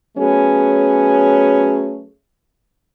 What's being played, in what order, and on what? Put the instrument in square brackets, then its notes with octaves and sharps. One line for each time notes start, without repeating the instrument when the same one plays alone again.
[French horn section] F#3 A3 B3 C#4 G#4